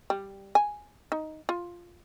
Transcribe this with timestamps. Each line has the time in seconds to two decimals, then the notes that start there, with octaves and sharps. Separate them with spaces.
0.10 G3
0.55 G#5
1.12 D#4
1.49 F4